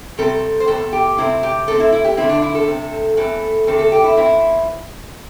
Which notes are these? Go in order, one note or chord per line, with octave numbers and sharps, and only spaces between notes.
C3 G3 C4 A4
C5
E2 C3 C4 A4
G4
C3 A3 C4 E4
G4
C3 A3 C4 A4
E4
E4
G4
G2 D3 A3 C4 E4
D4
E4
A4
C3 A3 C4
E2 E3 A3 C4 A4
E2 D3 A3 C4 A4
A4
G4
E4
E2 E3 C4 E4